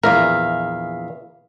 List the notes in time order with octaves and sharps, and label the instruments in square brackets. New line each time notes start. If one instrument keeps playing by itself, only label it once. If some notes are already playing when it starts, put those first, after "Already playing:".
[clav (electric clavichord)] A#1 E2 A#4 [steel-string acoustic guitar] E5 F5